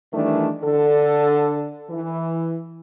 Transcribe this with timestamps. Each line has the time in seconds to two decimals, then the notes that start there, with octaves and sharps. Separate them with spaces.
0.13 D#3 E3 G3 A3 D4
0.64 D3 A4
1.90 E3